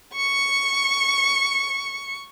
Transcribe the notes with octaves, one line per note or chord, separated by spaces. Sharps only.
C#6 C#7